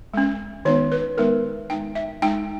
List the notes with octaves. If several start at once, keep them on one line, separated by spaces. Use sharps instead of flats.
G#3 C#4
D#3 G#3 B3 D#4 C#5
B4
D#3 G#3 B3 D#4 A#4
G#3 D#4 G5
E5
G#3 D#4 G5